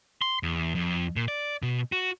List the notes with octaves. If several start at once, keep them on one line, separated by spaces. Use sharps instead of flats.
C6
E2
F2
A#2
D5
B2
F#4